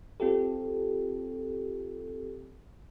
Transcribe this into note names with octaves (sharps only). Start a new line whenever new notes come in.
C4 F4 G4 A4